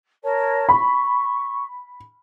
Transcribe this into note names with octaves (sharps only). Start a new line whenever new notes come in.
A#4 C#5 A5
B5 C#6